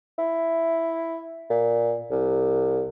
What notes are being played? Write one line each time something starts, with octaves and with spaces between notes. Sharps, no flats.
E4
A#2
C2